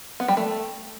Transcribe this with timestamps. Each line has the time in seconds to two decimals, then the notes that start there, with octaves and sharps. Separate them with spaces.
0.20 B3
0.28 G3
0.37 A3